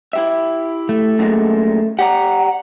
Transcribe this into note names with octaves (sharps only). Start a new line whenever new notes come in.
E4 G4 E5
A3
F#2 A#2 G#3
G4 D5 F#5 A#5